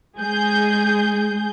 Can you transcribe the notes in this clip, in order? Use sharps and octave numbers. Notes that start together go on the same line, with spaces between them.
G#3 G#4 G6